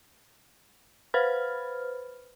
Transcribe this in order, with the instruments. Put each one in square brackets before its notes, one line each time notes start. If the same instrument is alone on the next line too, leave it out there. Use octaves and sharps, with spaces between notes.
[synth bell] B4 C5 B5 F6